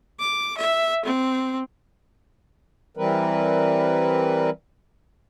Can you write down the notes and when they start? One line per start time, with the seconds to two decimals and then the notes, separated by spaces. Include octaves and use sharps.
0.20 D6
0.57 E5
1.05 C4
2.97 E3 G3 C4 A#4 B4